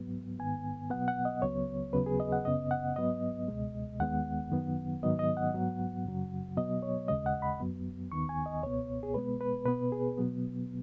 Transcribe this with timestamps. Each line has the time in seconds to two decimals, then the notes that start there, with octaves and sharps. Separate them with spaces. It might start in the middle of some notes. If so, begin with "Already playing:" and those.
Already playing: G#2 F#3 B3
0.39 G#2 D#3 B3 G#5
0.90 B2 F#3 B3 F#5
1.08 F#5
1.25 D#5
1.42 C#2 C#3 F#3 B3 C#5
1.93 D#2 C#3 F#3 B3 B4
2.06 G#4
2.20 D#5
2.32 F#5
2.45 F#2 C#3 B3 D#5
2.71 F#5
2.96 G#2 F#3 B3 D#5
3.48 C#2 B2 G#3
3.99 D#2 D#3 G#3 B3 F#5
4.51 F#2 D#3 F#3 B3
5.03 G#2 D#3 F#3 B3 D#5
5.19 D#5
5.37 F#5
5.54 G#2 F#3 B3
6.05 F#2 C#3 F#3
6.57 B2 F#3 B3 D#5
6.83 C#5
7.08 D#2 C#3 G#3 D#5
7.26 F#5
7.42 B5
7.60 F#2 F#3 B3
8.12 D#2 D#3 B3 C#6
8.29 G#5
8.46 D#5
8.63 C#2 B2 B3 C#5
9.03 G#4
9.14 B2 G#3 B3 B4
9.41 B4
9.66 B2 B3 B4
9.92 G#4
10.17 B2 F#3 B3